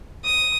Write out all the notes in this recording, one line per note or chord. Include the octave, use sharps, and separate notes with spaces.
D#6